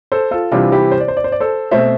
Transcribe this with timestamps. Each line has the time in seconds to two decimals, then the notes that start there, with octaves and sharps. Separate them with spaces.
0.12 A4 C5
0.31 F4 A4
0.52 C3 E3 G3 C4 D4 F4
0.72 E4 G4
0.92 C5
1.00 D5
1.08 C5
1.17 D5
1.24 C5
1.32 D5
1.40 A4 C5
1.71 B2 A3 C4 C5 E5